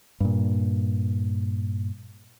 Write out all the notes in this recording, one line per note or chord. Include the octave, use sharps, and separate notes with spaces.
G2 A#2